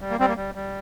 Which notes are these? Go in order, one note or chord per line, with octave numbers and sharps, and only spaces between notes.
G3
A#3
G3 C4
A#3
G3
G3